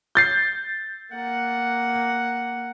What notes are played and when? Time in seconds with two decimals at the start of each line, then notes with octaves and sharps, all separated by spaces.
0.15 G6 A6 C7
1.14 A#3 F#5